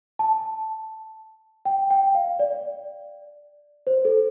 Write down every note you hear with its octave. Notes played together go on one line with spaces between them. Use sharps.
A5
G5
G5
F5
D5
C5
A4